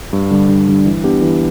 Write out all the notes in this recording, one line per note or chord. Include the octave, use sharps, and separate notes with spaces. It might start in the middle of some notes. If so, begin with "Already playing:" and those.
G2
D3 G3 D4
G2
D3 G3 D4
E3
B3 D4 G4
E3